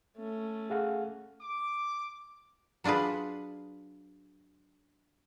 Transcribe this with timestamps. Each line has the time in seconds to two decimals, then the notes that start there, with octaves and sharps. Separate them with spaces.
0.17 A3 C#4
0.70 G#4 F5 F#5
1.41 D6
2.84 F#3 D4 F4 G#4 B4